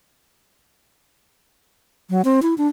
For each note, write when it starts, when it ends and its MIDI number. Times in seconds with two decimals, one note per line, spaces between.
2.10 2.22 54
2.25 2.40 60
2.42 2.54 64
2.58 2.67 62